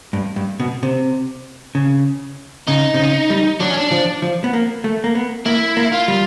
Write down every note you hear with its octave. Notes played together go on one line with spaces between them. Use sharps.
G2
G2
B2
C3
C#3
C#3 D#4
C3
C#3
G3
F#3 D4
C#4
D4
F3
F3
B3
A#3
A3
A#3
B3
A#3 E4
A#3
F4
G3